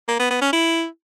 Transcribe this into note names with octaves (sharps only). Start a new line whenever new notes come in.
A#3
B3
B3
C#4
E4